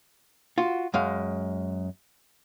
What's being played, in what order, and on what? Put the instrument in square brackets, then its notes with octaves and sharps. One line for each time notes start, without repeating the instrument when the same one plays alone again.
[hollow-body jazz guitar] F4 F#4
F#2 G#3 F5